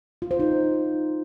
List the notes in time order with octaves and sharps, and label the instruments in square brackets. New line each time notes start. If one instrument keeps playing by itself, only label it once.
[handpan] F4
C5
D#4